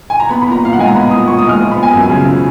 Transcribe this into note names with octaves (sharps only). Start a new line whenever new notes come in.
G#5
A#5
B3 B5
B5
A#2
A#5
A#2 F5
F#5
G#3 G#5
A#5
B3 B5
A#2 D#6
A#2 C#6
D#6
G#3 F6
F3 D#6
B5
B3
G#5
F#2
C#3
F3